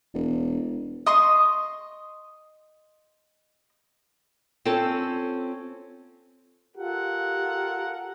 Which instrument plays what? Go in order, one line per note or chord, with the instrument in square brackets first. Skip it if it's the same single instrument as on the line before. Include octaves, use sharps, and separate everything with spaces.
[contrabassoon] E1
[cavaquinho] D#5 C6 C#6 D#6
[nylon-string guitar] C4 C#4 F4 A4
[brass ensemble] F4 G4 A4 A#4 F#5